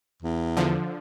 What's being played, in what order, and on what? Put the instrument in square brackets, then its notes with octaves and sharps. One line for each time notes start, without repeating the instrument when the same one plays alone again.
[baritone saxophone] E2
[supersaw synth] D3 F3